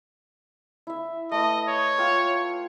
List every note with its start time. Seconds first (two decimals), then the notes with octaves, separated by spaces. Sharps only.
0.87 E4 E5
1.32 A3 B4 D#5
1.68 C#5
1.98 F4 G5 E6